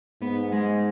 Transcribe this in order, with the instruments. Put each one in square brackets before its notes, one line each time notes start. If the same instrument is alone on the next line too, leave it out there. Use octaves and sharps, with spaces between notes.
[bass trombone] G#2 [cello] B3
[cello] G#3